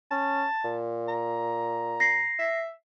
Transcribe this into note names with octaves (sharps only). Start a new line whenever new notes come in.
C#4 A5
A#2
A#5
A#6 C7
E5